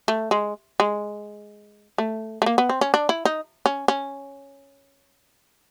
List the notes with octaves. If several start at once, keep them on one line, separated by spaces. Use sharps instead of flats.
A3
G#3
G#3
A3
A3
A#3
B3
C4
C#4
D4
E4
D#4
C#4
C#4